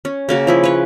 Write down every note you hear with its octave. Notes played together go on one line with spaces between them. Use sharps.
C#4
C#3 A#3 F#4
F3 E4 G#4
B4 C#5